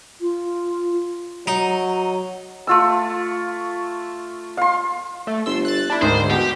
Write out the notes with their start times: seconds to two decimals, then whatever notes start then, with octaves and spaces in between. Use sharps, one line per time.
0.21 F4
1.47 F#3 D#4
2.67 A3 F4 E6
4.57 F5 C6
5.27 A3
5.46 G1 C6 E6
5.65 F#6 A6
5.90 D4 E4
6.02 D2 G#2 D#3 C5
6.30 B2 G4